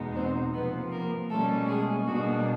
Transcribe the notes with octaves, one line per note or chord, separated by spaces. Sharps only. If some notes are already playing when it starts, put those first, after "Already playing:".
Already playing: E2 B2 G#3 B3 D#4
C4 C5
C3 F3 A#3 B3 B4
A#3 A#4
B2 G3 A3 A#3 C#4 A4
G#3 G#4
B2 G3 A#3 D4 F#4